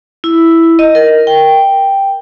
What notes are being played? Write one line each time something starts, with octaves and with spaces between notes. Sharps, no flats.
E4
D#5
A#4
G5